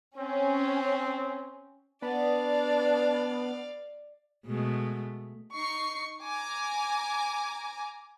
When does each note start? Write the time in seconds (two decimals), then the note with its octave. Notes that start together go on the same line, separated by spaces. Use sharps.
0.17 C4 C#4
2.02 B3 D4 D5 F5
4.46 B2 G#3 A3
5.55 D#4 C#6 C7
6.23 G#5 A#5 D6